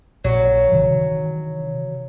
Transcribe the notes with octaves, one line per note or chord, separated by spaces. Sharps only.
A#1 F#3
C3 D#3 E3